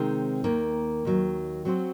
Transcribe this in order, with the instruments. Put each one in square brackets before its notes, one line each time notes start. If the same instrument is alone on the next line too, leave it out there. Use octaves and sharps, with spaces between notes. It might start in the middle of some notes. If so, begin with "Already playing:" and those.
Already playing: [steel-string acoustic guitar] C3 D#3 G#3 C4 D#4
D#2 D#3 A#3
D#2 D#3 F#3
F#3 C4 F#4 C5